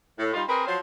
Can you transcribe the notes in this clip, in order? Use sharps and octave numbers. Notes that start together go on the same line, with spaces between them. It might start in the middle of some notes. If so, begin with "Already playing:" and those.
A2
G3 D#4 F4
C4 G#4 A#4 B4
F3 F#3 C5